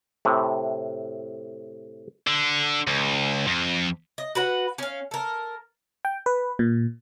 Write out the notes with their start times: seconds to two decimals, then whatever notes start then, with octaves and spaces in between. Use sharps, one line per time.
0.25 A2 C3
2.27 D3
2.87 C#2
3.47 F2
4.18 D#5
4.35 F#4 B4 F#5
4.78 C#4 F5
5.11 A4 A#4
6.05 G5
6.26 B4
6.59 A#2